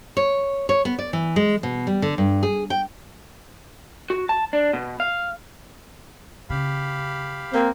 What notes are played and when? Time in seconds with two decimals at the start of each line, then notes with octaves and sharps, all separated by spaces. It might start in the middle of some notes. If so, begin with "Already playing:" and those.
0.17 C#5
0.69 C#5
0.85 B3
0.99 D5
1.13 E3
1.36 G#3
1.63 B2
1.87 G3
2.02 D3
2.18 G2
2.43 G#4
2.70 G5
4.10 F#4
4.29 A5
4.53 D4
4.73 B2
5.00 F5
6.50 C#3 G4 F5 B5
7.53 A#3 C4